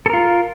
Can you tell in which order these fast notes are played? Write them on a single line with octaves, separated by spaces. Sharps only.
A4 A#4 F4